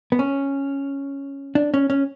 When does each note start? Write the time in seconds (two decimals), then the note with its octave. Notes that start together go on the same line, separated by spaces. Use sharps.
0.12 B3
0.19 C#4
1.55 D4
1.74 C#4
1.90 C#4